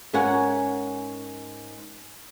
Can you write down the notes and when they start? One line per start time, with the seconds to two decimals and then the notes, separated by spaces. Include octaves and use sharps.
0.13 G#2 C#4 A#4 C#5 F#5 G#5